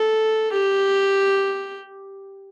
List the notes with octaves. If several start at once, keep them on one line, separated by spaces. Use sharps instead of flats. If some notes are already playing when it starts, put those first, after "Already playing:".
Already playing: A4
G4